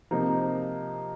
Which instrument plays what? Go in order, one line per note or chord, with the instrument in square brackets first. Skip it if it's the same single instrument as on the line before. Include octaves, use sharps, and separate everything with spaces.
[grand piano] C3 F3 A#3 D#4